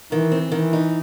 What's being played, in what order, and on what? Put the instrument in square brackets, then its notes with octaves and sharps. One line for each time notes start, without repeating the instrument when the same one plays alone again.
[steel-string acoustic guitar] D#3 [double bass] E3
[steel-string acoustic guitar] C4
[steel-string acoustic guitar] D#3 [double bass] E3
[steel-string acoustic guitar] D#4